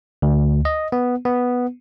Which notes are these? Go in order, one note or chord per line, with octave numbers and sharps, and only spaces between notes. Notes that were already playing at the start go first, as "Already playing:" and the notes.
D2
D#5
B3
B3